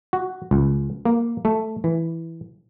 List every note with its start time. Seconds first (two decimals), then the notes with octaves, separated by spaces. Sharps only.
0.13 F#4
0.51 C#2
1.05 A#3
1.45 A3
1.84 E3